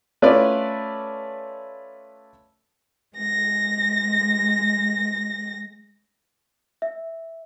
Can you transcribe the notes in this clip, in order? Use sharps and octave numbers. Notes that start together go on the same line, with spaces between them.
A3 C#4 F4 B4 D5
G#3 A#6
E5